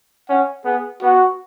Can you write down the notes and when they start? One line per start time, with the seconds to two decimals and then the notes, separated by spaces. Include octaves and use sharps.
0.29 C#4 F#5
0.65 B3 G#4
1.02 B3 F#4